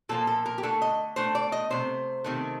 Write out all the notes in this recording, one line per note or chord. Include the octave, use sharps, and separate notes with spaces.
A#2 F3 A#3 A4
A4
A#4
G4
D3 A3 A4
D#5
D3 A3 C5
D5
D#5
C3 D#3 A3 C5
C3 D#3 A3